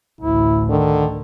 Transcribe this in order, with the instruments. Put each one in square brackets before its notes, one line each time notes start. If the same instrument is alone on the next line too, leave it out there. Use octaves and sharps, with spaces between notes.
[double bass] A1 D2 [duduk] E4
[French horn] D3 [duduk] D#3